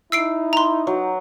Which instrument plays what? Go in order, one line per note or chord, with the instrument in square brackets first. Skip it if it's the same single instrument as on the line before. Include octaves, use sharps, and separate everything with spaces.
[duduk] D#4 [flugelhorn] E4 [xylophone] E6 C7 D7
[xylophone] A#5 C6
[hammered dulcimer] F#3